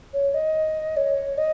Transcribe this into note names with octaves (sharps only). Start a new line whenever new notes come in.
C#5
D#5
C#5
D#5